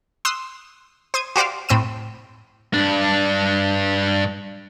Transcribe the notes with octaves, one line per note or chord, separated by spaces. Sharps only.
C6 D#6 E6 F#6
C5 D#6 G#6
F#4 G4 C5 D5 F5
A2 C4 E6 D#7
G2 D4